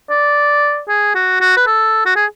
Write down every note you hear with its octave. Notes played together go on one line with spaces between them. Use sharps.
D5
G#4
F#4
F#4
B4
A4
F#4
G#4